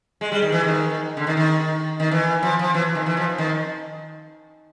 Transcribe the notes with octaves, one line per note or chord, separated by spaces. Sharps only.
G#3
G3
D#3
E3
D#3
D3
D#3
D#3
D#3
E3
F3
F3
E3
D#3
E3
F3
D#3